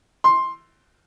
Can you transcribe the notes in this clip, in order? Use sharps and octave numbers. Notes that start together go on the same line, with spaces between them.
C6